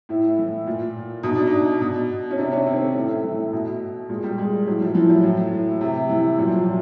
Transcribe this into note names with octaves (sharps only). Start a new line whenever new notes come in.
A2 E4
E3
A#2
B2 D#4
D4
D#4
B2
C#4
C3 D4
C#4
D#3 C4
A3
A2
E3
B2
A#2 G#3
G3
G#3
A2 F#3
F3
E3 F3
F#3
A2
E3
C3
E3
A#2 F#3
F3
F#3